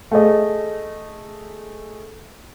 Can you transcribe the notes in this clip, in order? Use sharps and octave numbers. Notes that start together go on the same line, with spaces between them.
A3 G#4 D#5